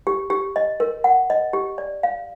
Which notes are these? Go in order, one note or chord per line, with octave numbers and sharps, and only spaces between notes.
G4
G4
D#5
A#4
F#5
D#5
G4
D5
F5